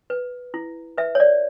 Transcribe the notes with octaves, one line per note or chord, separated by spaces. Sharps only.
B4
E4
B4 E5
C#5
D5